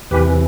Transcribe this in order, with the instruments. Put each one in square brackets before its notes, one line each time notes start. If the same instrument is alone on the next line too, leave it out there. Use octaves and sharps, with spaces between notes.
[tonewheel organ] E2 C3 E3 G4 B4